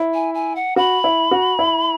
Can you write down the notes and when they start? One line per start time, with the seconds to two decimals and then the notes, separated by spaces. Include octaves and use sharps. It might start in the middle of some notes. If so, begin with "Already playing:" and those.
Already playing: E4
0.14 G#5
0.34 G#5
0.56 F#5
0.76 F#4 B5
1.04 E4
1.31 F#4
1.59 E4